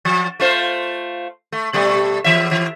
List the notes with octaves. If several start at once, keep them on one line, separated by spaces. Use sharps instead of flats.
F3
A3 F4 C5
A3
B2 G3 A3
E2 E3 E5
E3